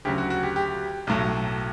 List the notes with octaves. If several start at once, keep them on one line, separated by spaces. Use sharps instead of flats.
D2 C#3 F#3 G4
F#4
F#4
G4
G4
B1 A2 F#3